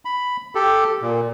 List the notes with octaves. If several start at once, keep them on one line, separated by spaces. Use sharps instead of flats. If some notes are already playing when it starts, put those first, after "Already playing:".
B5
G4 A4
A#2